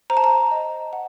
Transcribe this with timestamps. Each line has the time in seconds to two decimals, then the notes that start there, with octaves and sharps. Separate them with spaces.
0.10 C5 A#5
0.17 A5
0.24 A#5
0.51 D#5
0.93 F#5